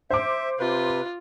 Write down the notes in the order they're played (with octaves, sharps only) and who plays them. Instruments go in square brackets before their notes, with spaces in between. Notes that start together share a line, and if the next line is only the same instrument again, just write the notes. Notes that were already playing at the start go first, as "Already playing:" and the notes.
[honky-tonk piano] C5 D6 [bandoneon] E5
[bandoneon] C3 B4 [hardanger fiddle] F4